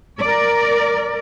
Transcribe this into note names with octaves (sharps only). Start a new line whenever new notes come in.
A#4 D5